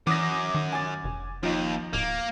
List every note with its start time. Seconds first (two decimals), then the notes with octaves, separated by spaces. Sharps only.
0.07 F#2 E3 D6 D#6 A#6
0.54 D#3
0.72 G#5 A6
1.04 F1
1.43 D#2 F3 D#4
1.93 D1 A#3